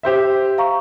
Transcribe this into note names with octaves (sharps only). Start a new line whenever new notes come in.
G4 C5 E5
F5 A#5 C#6